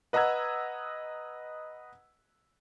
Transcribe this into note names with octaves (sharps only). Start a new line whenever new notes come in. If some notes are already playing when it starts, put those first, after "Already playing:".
B4 D#5 F#5 A#5 E6 G#6